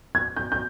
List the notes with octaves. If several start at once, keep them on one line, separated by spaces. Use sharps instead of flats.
G#6
G6
G6